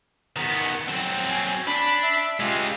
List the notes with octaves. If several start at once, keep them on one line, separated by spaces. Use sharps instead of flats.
D#3 B3
F#3 C4
G#5
D4 B5
E5
G#3 F4 G4